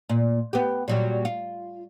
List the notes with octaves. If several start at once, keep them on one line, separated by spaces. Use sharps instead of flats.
A#2
B3 G4
A#2 F#3 G3
F4